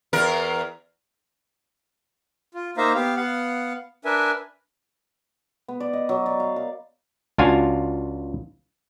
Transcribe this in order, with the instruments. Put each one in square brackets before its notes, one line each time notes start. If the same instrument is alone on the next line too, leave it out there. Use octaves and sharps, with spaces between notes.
[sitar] E2 A#4
[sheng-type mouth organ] F4
A#3 D#4 C5 E5 F5 A#5
B3 G4 F5
B3 F5 F#5
D4 A#4 B4 E5 G#5
[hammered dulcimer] B3
D5
D#5
F#3
D5
F5
A#4
[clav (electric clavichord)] C#2 D4 F4 F#4 F5 G#5